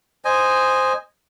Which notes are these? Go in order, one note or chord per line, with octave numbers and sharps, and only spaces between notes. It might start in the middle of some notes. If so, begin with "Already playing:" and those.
C5 D#5 G#5